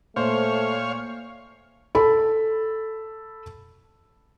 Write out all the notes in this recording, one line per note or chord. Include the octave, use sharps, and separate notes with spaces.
A#2 A3 C5 C#5 F5
A4 B5